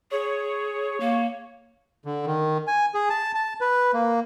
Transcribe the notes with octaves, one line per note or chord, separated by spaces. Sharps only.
G#4 C#5
A#3
D3
D#3
G#5
G#4
A5
A5
B4
A#3